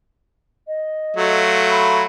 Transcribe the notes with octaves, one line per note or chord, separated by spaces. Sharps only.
D#5
F#3 A3 F4
B5